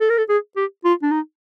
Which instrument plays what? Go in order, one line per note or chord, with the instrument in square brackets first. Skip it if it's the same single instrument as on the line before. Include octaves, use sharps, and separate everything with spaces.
[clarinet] A4
A#4
A4
G#4
G4
F4
D4
D#4